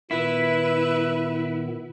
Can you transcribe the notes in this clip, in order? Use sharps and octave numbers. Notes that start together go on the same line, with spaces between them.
A#2 D#3 B3 E4 B4 E5